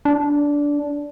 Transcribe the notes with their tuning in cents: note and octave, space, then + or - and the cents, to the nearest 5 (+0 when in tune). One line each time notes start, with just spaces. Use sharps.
D4 -15